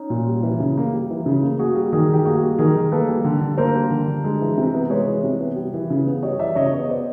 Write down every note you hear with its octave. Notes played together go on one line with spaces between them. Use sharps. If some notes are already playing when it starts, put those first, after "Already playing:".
Already playing: C#4 D#4
A#2
G3
E3
C#3
A#3
G3
E3
C#3
A#3
A#3 F#4 G#4
G3
D#3 G#4 A#4
D#3 G4
A#3 F#4 G#4
G3
D#3 G#4 A#4
D#3
A#3 A4 B4
G3
D3
D3
A#3 A#4 C5
G3
D3
D3
G#3
E3
C3
B3
G#3 B4 C#5
E3
C3
B3
G3
E3
C#3
B3
G3 C#5 D#5
E3 D5 E5
C#3 C#5 D#5
B3 C#5 D#5
B3 C5 D5